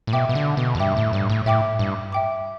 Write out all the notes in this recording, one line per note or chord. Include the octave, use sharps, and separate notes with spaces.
A2
B2 E5 G5 D6
B2
D3
B2
E2
G2 E5 G5 D6
A2
G2
A2
A2 E5 G5 D6
G2
E5 G5 D6